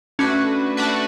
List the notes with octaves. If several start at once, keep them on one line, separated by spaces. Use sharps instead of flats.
A3 C#4 D4 F#4 B4
A3 D4 F#4 B4